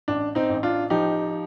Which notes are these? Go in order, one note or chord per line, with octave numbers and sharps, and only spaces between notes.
A1 D4
C4 D#4
A1
D4 F4
F3 D#4 G4